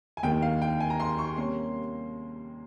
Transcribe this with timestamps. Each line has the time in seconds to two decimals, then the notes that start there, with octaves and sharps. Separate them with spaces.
0.17 G#5
0.23 D#2 D#3 A#3 G5
0.42 F5
0.62 G5
0.80 G#5
0.90 A#5
1.00 C6
1.18 C#6
1.37 C3 G3 A#3 C#4 C6